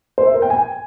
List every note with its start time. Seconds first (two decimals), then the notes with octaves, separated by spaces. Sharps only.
0.18 C5
0.26 E5
0.34 A#4
0.42 G5
0.50 G#5